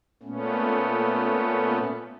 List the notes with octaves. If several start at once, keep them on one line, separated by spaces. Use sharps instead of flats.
A#2 A3 B3 C#4